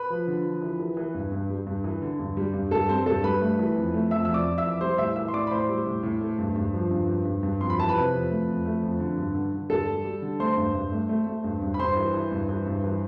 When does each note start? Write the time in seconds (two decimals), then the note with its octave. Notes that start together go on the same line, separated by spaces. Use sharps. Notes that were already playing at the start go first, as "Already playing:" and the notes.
Already playing: B4 B5
0.10 F3
0.27 D3
0.45 F3
0.62 E3
0.80 E3
0.97 E3
1.14 G2
1.32 G2
1.50 G3
1.67 G2
1.84 E3
2.02 D3
2.20 G2
2.37 G3
2.54 G2
2.71 G2 A4 A5
2.89 G3 C4 C5
3.06 G2 A4 A5
3.24 G3 B4 B5
3.42 A3
3.59 E3
3.76 F2
3.94 A3
4.11 F2 E5 E6
4.25 F2 E6
4.34 D5 D6
4.46 F2
4.58 E5 E6
4.64 E3
4.81 G3 C5 C6
4.98 A2 E5 E6
5.15 E3 E5 E6
5.28 C6
5.34 A2 D5 D6
5.47 B5
5.51 A2 C5 C6
5.69 G3
5.86 A2
6.03 A2
6.21 A3
6.38 G2
6.56 G2
6.73 F3
6.91 G2
7.08 G2
7.25 G2
7.43 G2
7.60 F2 C6
7.70 B5
7.78 E3 A5
7.89 B4 B5
7.95 C3
8.12 F2
8.30 A3
8.48 F2
8.65 A3
8.83 F2
8.99 D3
9.17 G2
9.35 D3
9.52 D3
9.69 G2 A4 A5
9.88 G3
10.04 G3
10.22 D3
10.40 A3 C5 C6
10.57 G2
10.75 G2
10.92 A3
11.09 A3
11.27 A3
11.44 G2
11.62 G2
11.74 B5
11.79 G2 C5 C6
11.96 E3
12.14 E3
12.32 G2
12.49 E3
12.66 G2
12.84 E3